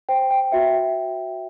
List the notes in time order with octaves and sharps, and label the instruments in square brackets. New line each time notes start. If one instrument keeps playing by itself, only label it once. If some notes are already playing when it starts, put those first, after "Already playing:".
[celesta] C5 G5
G5
F#4 E5